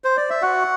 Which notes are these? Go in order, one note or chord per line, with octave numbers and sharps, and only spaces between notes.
C5
D5
E5
F#4 F#5